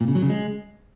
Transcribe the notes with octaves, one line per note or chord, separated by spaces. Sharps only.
A#2
C#3
F#3
C#3
G#3